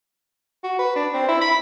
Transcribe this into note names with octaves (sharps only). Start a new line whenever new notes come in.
F#4
B4
D4
C4
E4
B5